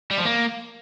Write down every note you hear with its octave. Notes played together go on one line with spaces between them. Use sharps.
G3
F3
A#3